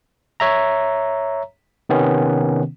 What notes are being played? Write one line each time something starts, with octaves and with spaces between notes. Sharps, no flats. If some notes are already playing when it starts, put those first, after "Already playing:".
C#5 E5 A#5
C3 D#3 B3 C#4